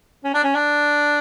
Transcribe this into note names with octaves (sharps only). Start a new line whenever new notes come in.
C#4
D4
C#4
D4